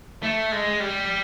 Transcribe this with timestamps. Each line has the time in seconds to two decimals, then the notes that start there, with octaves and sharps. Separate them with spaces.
0.23 A3
0.52 G#3
0.80 G3